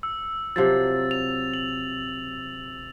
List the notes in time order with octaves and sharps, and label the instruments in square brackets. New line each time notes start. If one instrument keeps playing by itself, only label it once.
[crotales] E6
[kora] C3 F3 F#3 [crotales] A6
[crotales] F7
F#7